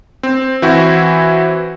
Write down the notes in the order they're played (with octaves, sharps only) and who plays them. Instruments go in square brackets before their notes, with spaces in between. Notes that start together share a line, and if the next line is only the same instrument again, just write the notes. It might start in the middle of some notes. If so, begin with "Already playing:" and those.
[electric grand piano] C4
E3 C4 E4 F#4